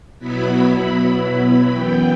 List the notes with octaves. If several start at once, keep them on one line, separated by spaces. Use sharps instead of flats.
B2 F#3 B3 E4 B5
F#2 E3 B3 G5